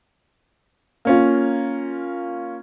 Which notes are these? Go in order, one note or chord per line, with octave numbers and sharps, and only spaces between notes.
A#3 C#4 F4